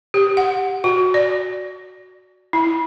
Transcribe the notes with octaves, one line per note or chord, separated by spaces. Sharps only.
G4
F#5
F#4
D5
E4